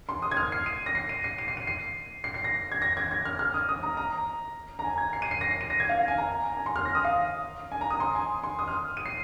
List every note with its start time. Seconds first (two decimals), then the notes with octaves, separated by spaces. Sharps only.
0.09 C6
0.22 D#6
0.31 G#6
0.37 F6
0.52 C7
0.66 D#7
0.86 A#6
0.95 C7
1.09 D#7
1.24 C7
1.38 D#7
1.48 C7
1.57 D#7
1.67 C7
2.24 C7
2.34 C7
2.44 A#6
2.72 G#6
2.82 A#6
2.97 G#6
3.11 G#6
3.25 F6
3.39 F6
3.54 D#6
3.69 D#6
3.83 A#5
3.97 A#5
4.79 A#5
4.84 G#5
4.98 G#6
5.13 C7
5.22 D#7
5.31 C7
5.41 A#6
5.51 C7
5.61 D#7
5.70 A#6
5.80 G#6
5.89 F5
5.99 F5
6.08 G#5
6.18 A#5
6.57 G#5
6.66 C6
6.76 F6
6.85 A#6
6.95 D#6
7.04 F5
7.72 G#5
7.81 A#5
7.90 D#6
8.00 C6
8.15 G#5
8.43 C6
8.59 D#6
8.68 F6
8.97 D#7
9.06 C7